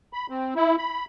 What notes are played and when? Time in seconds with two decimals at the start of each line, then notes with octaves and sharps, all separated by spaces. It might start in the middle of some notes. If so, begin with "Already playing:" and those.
0.13 B5
0.30 C4
0.56 E4
0.78 B5